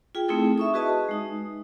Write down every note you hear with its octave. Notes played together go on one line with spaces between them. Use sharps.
F4 G#4 G5
A3 C4 D#4 E4 G#4 A4
E5 C#6 D#6
F#4 G#4 B4 D#5 A5
G#3 D#4 D#6